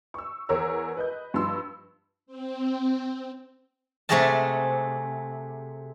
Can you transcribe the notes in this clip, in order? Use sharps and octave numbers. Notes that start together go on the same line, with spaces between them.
C#6 E6
E2 A#4 C#5 E6
B4 D#5 G6
G2 F3 C6 E6
C4
C3 A3 F#4 G#4 D#5 A5